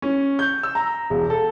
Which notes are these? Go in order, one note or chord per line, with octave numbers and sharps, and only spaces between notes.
C#4
G6
E6
A#5
E1
A4